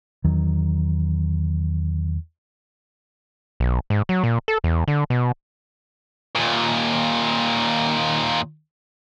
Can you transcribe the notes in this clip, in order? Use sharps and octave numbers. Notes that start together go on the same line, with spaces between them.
E2 D#3 F#3
B1
G#2
F#3
A#2
A4
E2
D3
B2
D#2 A#2